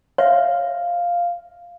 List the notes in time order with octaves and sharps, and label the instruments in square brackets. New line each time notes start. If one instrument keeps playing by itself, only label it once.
[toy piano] C#5 E5 [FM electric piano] F5